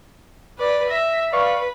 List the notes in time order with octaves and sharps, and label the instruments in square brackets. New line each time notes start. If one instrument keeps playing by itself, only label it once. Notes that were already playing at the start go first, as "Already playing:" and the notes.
[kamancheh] B4 D5
[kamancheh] E5 [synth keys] A#6
[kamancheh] B4 [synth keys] D5 F5 C#6